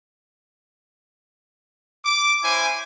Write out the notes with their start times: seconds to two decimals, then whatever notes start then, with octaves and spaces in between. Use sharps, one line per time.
2.05 D6
2.43 C#4 E4 C5 G#5